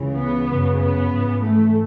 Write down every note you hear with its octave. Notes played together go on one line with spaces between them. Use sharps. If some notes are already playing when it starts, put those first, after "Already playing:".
Already playing: C#2 C#3 E3
B3
F#2 C#3 F#3
B3
G#2 E3
A3